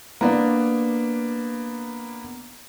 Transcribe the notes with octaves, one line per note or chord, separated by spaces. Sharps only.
A#3 B3 D4